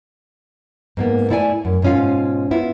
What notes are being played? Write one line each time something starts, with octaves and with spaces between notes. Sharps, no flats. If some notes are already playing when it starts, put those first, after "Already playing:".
G#2 A#3 B3
A3 E4 D5 E5 G#5
F#2
G#2 B2 C#4 F4 F5
B3 E4 F4